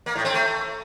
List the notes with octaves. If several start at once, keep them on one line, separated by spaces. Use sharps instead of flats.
A#3
A2
C4
A3